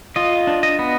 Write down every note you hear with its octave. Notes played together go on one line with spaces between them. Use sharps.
F4 D#5
D4
D#5
B3